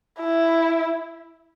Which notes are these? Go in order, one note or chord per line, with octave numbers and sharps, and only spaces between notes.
E4